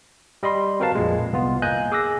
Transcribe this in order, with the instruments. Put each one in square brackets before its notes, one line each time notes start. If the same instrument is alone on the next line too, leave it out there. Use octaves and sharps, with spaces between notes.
[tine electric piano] G3 D#5 B5 C6
C4 F#4 A#4 B4 F5 A5
A#1 F2 A#2 G#3
C2 B3 F4
A#3 D#5 G#5 F#6 G6
G#4 D6 E6 F#6 A#6